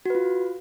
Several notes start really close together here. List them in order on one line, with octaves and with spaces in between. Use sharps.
F#4 B4 F4